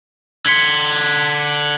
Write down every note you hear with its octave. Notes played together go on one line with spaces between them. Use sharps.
D3 C6 G#6 B6 C#7